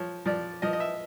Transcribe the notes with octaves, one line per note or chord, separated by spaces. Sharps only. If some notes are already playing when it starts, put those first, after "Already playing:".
Already playing: F3 C#5
F3 D5
F3 D#5
D#5
E5